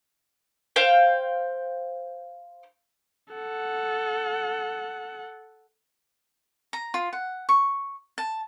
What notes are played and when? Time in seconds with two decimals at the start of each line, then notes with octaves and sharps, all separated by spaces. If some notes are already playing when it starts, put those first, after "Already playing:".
0.76 C5 F5 G5
3.34 A4 F#5
6.73 A#5
6.94 F4
7.13 F#5
7.49 C#6
8.18 A5